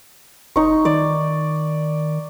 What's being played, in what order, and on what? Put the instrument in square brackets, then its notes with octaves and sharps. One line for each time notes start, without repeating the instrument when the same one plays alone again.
[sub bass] F#1 [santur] D#4 C#6
[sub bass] D#3 [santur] D5